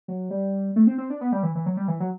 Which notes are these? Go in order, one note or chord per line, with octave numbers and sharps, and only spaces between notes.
F#3
G3
A3
C4
C4
D4
B3
G3
E3
E3
F#3
G3
E3
F#3